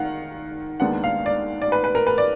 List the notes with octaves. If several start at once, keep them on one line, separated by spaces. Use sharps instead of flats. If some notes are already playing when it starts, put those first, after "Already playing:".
Already playing: D#3 F5 F#5
D#2 D#3 G#3 B3 D4 F#5
F5
D5
D5
B4
B4
A#4
B4
D5